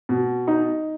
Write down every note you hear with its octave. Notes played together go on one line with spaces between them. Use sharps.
B2
D#4